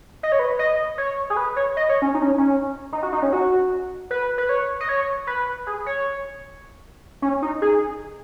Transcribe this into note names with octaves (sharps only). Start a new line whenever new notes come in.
D#5
C#5
B4
D#5
C#5
G#4
B4
C#5
D#5
C#5
C#4
D#4
C#4
C#4
D#4
F#4
D#4
C#4
F#4
B4
B4
C#5
D#5
C#5
B4
G#4
C#5
C#4
D#4
G#4